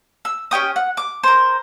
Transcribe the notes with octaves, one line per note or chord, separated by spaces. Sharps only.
E6
C#4 G4 G5 D#6
F#5
D6
A#4 C5